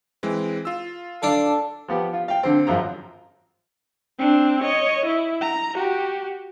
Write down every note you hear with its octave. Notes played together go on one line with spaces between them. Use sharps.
E3 G#3 C4
F4 E6
D4 A4 F5
F3 B3 G4
F4
F5 G5
D3 C4
G#1 F#2 F3 A#5
C4 D4
C#5 D#5
E4
A#5
F#4 G4